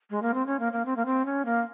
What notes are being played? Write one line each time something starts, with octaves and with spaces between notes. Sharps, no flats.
G#3
A#3
C4
C#4
A#3
A#3
C4
A#3
C4
C#4
A#3